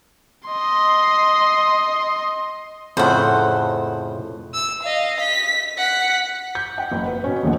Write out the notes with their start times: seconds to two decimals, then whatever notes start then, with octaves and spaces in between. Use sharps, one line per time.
0.49 D#5 C6
2.97 F2 A2 C#3 C5 F#5
4.54 E6
4.83 D#5 F5
5.20 B6
5.78 F#5 B6
6.55 G6
6.78 F#5 G5
6.92 F#1
7.06 B4
7.24 B2 C#4
7.43 D#1 A#2 D3 F#5